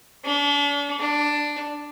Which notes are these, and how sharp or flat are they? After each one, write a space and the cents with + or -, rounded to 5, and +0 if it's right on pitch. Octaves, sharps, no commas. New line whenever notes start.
D4 -40
D4 +5